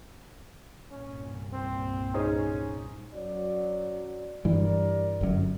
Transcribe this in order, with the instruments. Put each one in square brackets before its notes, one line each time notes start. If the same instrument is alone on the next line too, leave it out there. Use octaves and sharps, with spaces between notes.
[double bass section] C2 G2 A#2 [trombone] C#4
[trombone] C4
[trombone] C#4 [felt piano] D#4 G#4 C5
[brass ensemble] F#2 F#3 D5
[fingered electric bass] G2 E3 [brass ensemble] G3 A#4 D5
[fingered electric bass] G1 F#2